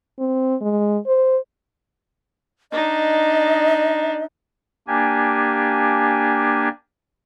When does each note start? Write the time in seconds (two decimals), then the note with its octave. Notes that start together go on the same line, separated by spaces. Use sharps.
0.19 C4
0.61 G#3
1.07 C5
2.72 D4 D#4 D#5
4.88 A#3 D4 G4 G#5